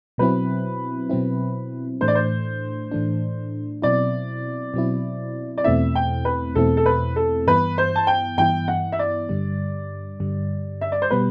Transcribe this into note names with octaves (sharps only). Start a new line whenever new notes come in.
B2 F#3 C4 E4 B4
B2 F#3 C4 E4
A2 E3 A3 D4 C5
D5
C5
A2 E3 A3 D4
B2 F#3 C4 E4 D5
B2 F#3 C4 E4
D5
E2 B2 A3 C4 E4 E5
G5
B4
E2 B2 A3 C4 E4 A4
A4
B4
A4
G2 E3 B3 E4 B4
C5
A5
G5
G2 E3 B3 E4 G5
F#5
E5
D5
G2 D3 G3
G2 D3 G3
E5
D5
C5
B2 G3 B3 B4